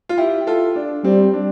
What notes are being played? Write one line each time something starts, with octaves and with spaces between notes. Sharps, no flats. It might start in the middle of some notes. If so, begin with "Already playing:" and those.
F4
E4 G4
F4 A4
D4
G3 C4
D4